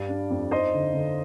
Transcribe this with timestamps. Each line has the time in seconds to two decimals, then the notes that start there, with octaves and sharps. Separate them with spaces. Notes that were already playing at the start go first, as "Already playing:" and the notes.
Already playing: G2 G3 D5 F5
0.09 D4
0.30 F2
0.51 D#4 C5 D#5
0.74 D3
0.94 D3